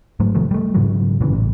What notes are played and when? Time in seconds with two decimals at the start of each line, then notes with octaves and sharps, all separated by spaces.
0.20 G#2 F#3 A3
0.35 C3 D#3 F3 A3
0.51 G3 A3
0.75 G#2 C#3 E3 F#3
1.21 G1 A#2 C#3 E3
1.33 A1